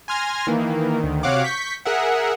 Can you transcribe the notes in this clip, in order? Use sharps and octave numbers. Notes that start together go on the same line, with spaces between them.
G#5 C6 F6 G#6 A#6
D#3 E3 A#3
D2 D#3
C3 F#4 C#5 F5 F#5 D6
C#6 G6 B6
G#4 A#4 E5 F#5